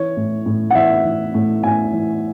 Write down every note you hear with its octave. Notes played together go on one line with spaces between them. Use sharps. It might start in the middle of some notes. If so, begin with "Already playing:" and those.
Already playing: E3 C#5
A2
A2
F#5
E3 E5
E3
A2
A2 G#5
E3